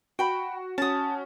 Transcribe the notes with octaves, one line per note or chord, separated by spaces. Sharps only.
F#4 G5 B5
C#4 F#4 A5 D#6